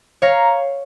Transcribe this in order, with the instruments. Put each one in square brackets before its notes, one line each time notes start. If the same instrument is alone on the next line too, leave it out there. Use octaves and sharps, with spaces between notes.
[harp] C#5 F5 [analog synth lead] A#5